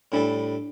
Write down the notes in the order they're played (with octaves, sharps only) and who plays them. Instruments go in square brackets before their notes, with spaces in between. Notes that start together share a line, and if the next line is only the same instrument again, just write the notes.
[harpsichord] A2 G3 E4 A4 [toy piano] D4